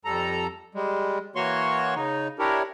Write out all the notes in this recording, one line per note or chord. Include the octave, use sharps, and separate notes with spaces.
F2 G3 A4 A#5
G3 G#3
E3 A#3 F#4 C#5 C6 C#6
C#3 D#4
D4 E4 G4 A#4 C#5